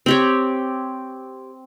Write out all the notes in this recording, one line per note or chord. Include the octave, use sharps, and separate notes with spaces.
C4 G4 C#5